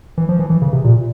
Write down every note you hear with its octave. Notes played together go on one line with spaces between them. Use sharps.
E3
F3
E3
E3
C#3
C3
A#2